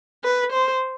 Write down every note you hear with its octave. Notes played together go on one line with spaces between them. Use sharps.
B4
C5